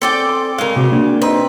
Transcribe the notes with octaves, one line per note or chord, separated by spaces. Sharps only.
C4 G#4 A4 D5 G5
C6
C#3 G#3 A#4 F5
C3 C4 F#4 G4
A#3 D4 F#4
C4 D#4 B4